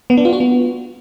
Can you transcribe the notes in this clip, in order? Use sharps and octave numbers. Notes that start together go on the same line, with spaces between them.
B3
D4
F4
F#4
B3